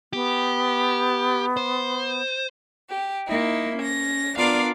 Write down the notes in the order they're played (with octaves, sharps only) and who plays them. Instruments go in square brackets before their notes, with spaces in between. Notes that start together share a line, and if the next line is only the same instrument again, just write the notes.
[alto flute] B3 [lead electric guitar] G4
[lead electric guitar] C5
[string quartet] G4
A#3 D#4 E4
C#4 A#6
B3 D4 F4 A#4 D5 F5